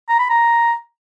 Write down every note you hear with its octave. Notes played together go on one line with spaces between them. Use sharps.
A#5
B5
A#5